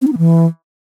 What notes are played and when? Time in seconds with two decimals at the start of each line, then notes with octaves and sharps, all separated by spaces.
0.02 C4
0.07 D#4
0.12 B3
0.18 E3